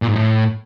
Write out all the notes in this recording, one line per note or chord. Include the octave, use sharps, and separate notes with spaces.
A#2
G#2
A2